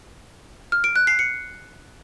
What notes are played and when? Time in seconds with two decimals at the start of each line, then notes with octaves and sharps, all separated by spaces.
0.72 F6
0.84 D7
0.96 F#6
1.07 C7
1.19 C#7